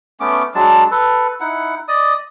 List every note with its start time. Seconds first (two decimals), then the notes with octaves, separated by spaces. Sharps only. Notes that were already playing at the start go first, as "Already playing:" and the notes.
0.20 A3 B3 C#4 D6
0.55 F#3 G#3 D4 A5
0.91 A4 B4
1.40 D#4 E4 F#5
1.88 D5 D#5 D#6